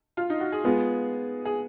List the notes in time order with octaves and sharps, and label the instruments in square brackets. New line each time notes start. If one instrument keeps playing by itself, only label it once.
[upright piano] F4
D#4
F#4
G#4
[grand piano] G#3 B3 F4
[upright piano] G#4